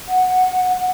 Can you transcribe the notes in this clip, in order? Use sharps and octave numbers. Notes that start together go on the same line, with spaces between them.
F#5